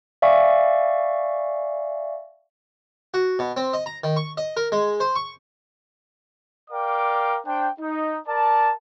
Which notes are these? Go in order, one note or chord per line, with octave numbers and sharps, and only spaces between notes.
D5 E5 F5 G#5 C#6
F#4
B2
C4
D#5
A#5
D#3
C#6
D#5
A#4
G#3
C5
C#6
A#4 D5 F5 G5 D6
D4 C5 G5
D#4
A#4 D5 A5